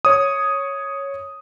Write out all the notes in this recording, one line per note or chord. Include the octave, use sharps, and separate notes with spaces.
C#5 D#6